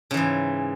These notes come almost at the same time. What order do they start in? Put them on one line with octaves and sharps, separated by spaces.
C#3 E3 G#2